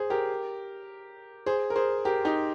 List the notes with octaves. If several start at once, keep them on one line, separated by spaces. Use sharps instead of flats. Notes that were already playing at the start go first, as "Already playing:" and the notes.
Already playing: G#4 C5
G4 A#4
G#4 C5
A#4
G#4 C5
G4 A#4
D#4 G4